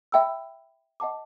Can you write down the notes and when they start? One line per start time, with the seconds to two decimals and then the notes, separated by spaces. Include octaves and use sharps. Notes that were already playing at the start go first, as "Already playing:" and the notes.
0.12 E5 G5 B5 E6
1.00 D#5 F#5 A5 D6